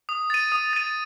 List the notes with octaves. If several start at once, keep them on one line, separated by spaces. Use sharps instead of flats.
D#6
A6 D#7
D#6
A6 D#7